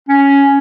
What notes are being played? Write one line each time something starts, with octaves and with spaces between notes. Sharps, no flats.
C#4